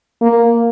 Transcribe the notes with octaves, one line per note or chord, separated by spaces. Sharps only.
A#3